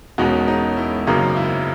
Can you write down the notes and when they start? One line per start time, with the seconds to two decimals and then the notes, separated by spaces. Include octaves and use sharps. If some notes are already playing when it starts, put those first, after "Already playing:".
0.18 E1 E2 B2 G#3 C#4 D#4 F#4
0.48 D#4
0.77 E4
1.07 G#1 F#2 C#3 F#3 A#3 D#4
1.37 E4